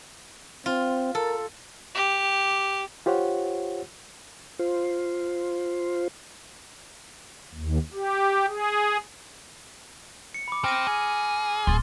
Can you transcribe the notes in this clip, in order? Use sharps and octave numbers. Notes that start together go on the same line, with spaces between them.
C4 F4
A4 A#4
G4
F4 G4 C5 C#5 F#5
F4 C5
D#2
G4
G#4
C#7
B5 D6
C4 F6 A#6 D#7
G#4
D1 C6 A6